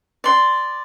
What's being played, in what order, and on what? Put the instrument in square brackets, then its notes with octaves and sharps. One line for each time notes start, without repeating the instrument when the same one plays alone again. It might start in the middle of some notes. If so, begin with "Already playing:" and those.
[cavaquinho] D5 C6